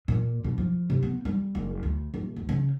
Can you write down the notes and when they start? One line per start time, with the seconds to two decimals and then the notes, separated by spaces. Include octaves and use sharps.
0.08 A#2
0.44 B2
0.58 F3
0.90 C3
1.03 B3
1.25 G3
1.55 F#1
1.83 D2
2.14 D#1
2.36 D2
2.49 C#3